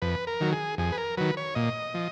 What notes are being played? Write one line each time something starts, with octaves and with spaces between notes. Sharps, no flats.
F2 B4
A#4
D#3 F#3
G#4
F2 G#4
B4
A#4
D#3 F#3 B4
C#5
A#2 D#5
F3